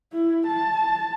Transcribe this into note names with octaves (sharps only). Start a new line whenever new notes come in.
E4
A5